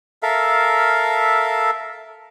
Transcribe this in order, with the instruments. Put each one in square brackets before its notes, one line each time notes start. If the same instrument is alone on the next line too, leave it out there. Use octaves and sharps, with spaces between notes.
[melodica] A4 A#4 E5 F5